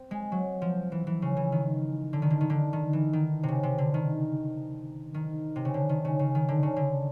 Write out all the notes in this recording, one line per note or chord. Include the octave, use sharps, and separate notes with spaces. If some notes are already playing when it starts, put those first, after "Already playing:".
Already playing: C4
G#3
F#3
F3
E3
E3
C#3
E3
D#3
D3
D#3
D3
D#3
D3
D#3
E3
D#3
C3
C#3
C3
D3
D#3
D#3
C3
C#3
D3
D#3
C#3
C#3
D#3
D3
C#3
D3